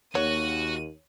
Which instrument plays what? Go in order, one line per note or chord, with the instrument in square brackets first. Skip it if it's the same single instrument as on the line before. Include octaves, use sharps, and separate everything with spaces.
[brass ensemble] D#2 [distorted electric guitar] F#4 [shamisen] C#5 [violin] D#7